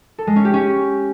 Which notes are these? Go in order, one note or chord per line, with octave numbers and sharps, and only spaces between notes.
A4
G#3
C#4
G4
C#4